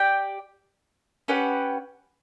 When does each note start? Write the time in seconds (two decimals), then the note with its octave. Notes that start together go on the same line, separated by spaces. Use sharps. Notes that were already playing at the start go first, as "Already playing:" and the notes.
Already playing: G4 D5 G5
1.28 C#4 G4 B4 F#5